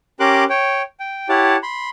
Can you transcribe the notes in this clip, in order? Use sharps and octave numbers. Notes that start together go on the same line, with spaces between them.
C#4 G4 A#4 C6 D6 F#6
C#5 G5
G5
E4 G4 C#5 F#5 A5
B5 C6